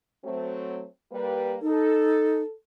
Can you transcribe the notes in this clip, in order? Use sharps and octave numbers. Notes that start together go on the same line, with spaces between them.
F#3 A3 C4
G3 A#3 B4
D#4 A4